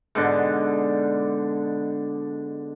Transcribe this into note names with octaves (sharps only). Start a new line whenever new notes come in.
G#2 B2 D3 D4